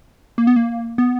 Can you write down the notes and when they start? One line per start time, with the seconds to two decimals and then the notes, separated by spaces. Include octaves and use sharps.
0.38 A#3
0.47 B3
0.56 A#3
0.98 B3